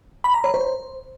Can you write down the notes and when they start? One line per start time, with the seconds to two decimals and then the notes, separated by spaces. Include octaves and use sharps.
0.24 B5
0.34 A#5
0.44 C#5
0.54 C5